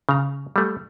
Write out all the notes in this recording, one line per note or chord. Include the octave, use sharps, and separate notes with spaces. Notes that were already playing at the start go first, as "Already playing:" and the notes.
C#3 A#5
G3 A3